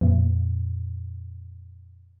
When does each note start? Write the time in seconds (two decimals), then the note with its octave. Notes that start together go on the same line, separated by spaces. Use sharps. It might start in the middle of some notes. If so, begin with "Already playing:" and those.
0.01 F2 A#2